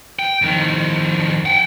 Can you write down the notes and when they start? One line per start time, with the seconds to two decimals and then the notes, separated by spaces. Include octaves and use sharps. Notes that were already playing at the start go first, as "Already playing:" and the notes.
0.19 G5
0.42 F2 D#3
1.46 F#5 G5